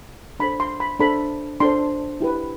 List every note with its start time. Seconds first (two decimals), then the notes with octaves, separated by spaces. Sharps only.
0.40 D4 A4 C5 B5
0.60 C6
0.80 B5
0.99 D4 A4 C5 B5
1.60 D4 A4 C5 C6
2.21 E4 G4 B4